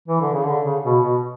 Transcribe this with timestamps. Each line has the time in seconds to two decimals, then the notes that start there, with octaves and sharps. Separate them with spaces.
0.08 E3
0.21 D3
0.33 C#3
0.45 D3
0.64 C#3
0.84 B2
1.03 B2